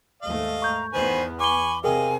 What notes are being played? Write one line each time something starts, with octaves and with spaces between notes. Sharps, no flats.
D#2 G#2 A3 D#5 F5
A#5 C#6 G6
E2 D#3 B3 B4 C5 G#5
G#5 B5 C#6 D6 G7
C3 G#4 A#4 D#5 F5 G5 G#5